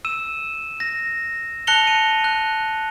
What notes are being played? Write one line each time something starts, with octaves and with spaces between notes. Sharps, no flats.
E6 D#7 E7
A#6
A5 F#6 A#6 C#7 F7 G7
D#7
F#6